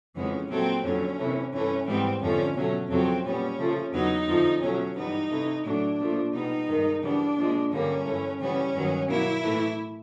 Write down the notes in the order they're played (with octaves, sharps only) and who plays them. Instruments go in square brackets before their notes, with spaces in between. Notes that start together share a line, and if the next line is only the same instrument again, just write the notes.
[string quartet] F2 C#3 E3 G#3 B3 C#4
A#2 F#3 A3 C4
F2 D3 F#3 C#4
C3 E3 A3
G2 E3 A3 C#4
G#2 E3 G3 B3 C4
F2 D3 F3 A3 C#4
B2 F#3 A3 C#4
F2 C#3 F#3 A3 C4
A#2 G3 B3 C#4
C#3 F3 A3
E2 C#3 F#3 B3 D#4
F2 D3 F3 A3
B2 F#3 A3 C#4
G2 E3 G3 B3 D#4
C3 E3 A3
A2 F#3 A3 D4
A#2 F3 A3
B2 G3 B3 D#4
G2 D#3 G#3
C#3 E3 G3 B3 D4
A#2 F3 G#3
G2 D3 G3 A#3 C#4
G2 E3 A3
C#3 E3 G3 B3 C#4
G2 D#3 F#3 B3
B2 F#3 A#3 E4
A2 E3 A3